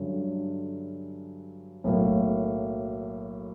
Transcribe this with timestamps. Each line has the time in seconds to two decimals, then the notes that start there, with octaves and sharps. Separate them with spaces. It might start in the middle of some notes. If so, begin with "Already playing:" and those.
Already playing: G2 D3 F#3 A3 C#4
1.84 B1 A2 F#3 A#3